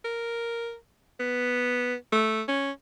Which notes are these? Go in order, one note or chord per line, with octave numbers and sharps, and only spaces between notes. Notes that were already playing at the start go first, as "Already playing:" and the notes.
A#4
B3
A3
C#4